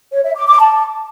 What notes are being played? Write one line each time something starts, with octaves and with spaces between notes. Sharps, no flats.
C#5
E5
D6
D6
A5